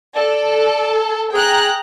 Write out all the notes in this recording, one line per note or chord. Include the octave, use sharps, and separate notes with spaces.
A4 D5
G#4 G5 A#5 F#6